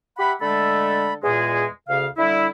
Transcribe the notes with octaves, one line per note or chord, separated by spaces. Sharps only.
G4 E5 F#5 B5
D3 G#3 A3 A4 B5
E2 A#2 G#3 G#4
D2 C#3 F5
D3 G3 E4